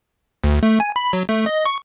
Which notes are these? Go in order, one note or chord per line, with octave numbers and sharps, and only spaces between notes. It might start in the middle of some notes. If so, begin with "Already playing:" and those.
D2
A3
G#5
B5
F#3
A3
D#5
C#6